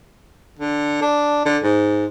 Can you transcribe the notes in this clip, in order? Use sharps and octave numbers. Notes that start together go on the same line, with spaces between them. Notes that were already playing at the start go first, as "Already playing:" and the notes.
D3
D4
D3
G#2